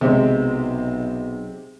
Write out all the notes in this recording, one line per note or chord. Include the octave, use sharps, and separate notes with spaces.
B1 C3 G#3 C4